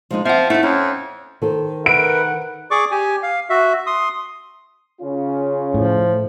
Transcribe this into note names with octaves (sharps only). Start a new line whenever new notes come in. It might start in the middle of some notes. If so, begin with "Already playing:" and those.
F3 G#3 D#4
F3 C4 E5 F#5
A3 D#4 E4
F2 C#4
D#3 A4 C5
A#4 B4 E5 F#5 D7
G#4 D5 C#6 D6
G4 G#5
F5
F#4 E5
C6 D#6
C#3 C#4 F4
A2 F3